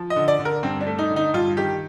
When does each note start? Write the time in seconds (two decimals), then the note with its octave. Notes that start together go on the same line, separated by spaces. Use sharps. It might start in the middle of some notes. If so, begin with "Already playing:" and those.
Already playing: F3
0.10 D#5
0.16 D3
0.28 D5
0.39 D3
0.45 A#4
0.63 G2 C4
0.81 D4
0.87 A3
0.99 D#4
1.10 D3
1.16 D#4
1.34 G2 F4
1.57 D#3 G4